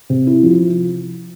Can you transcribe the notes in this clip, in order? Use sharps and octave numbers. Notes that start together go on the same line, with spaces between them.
C3
E4
F3